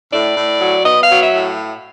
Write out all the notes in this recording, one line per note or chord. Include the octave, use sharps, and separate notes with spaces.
A2 D5
A2
F#3
B3 D#5
F5
F#3
E5
A2